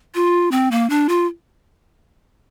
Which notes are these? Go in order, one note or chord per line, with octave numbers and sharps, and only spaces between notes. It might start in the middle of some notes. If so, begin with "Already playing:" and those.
F4
C4
A#3
D4
F4